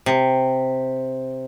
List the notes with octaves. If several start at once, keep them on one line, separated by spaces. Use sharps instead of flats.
C3